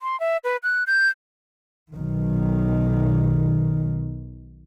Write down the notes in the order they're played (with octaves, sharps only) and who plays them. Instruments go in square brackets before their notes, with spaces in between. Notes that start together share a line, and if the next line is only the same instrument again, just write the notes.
[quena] C6
E5
B4
F#6
G6
[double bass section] B1 D#3